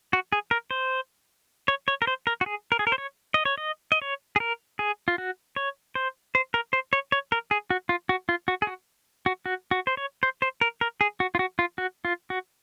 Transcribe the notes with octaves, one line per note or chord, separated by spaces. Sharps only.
F#4
G#4
A#4
C5
C#5
C#5
A#4
C5
A#4
F#4
G#4
A#4
G#4
A#4
C5
C#5
D#5
C#5
D#5
D#5
C#5
G#4
A#4
G#4
F4
F#4
C#5
C5
C5
A#4
C5
C#5
C#5
A#4
G#4
F#4
F4
F#4
F4
F#4
G#4
F#4
F#4
F#4
F#4
C5
C#5
C5
C5
A#4
A#4
G#4
F#4
F4
F#4
F4
F#4
F4
F#4